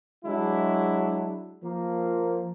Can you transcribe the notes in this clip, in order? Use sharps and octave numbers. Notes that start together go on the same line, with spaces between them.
F#3 G#3 D4 E4
F3 A#3